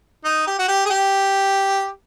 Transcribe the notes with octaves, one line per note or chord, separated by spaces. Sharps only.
D#4
G4
F#4
G4
G#4
G4